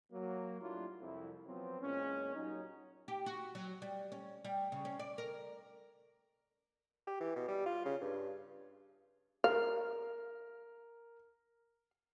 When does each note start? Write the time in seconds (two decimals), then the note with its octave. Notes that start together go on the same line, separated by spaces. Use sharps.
0.12 F#3 A#3
0.62 A2 F#3 G3 D4 E4 F4
1.01 C2 F2 E4
1.47 F3 F#3 B3 C4
1.81 E2 A#2 G#3 C#4
2.36 A#2 F#3 G3 C#4 D#4
3.08 G4
3.26 F#4
3.55 F#3
3.82 G3
4.12 C#4
4.45 G3
4.72 C#3
4.85 C#4
4.99 D5
5.18 A#4
7.07 G4
7.21 E3
7.36 B2
7.48 G3
7.66 F4
7.85 C#3
8.01 G2
9.44 A#4 F5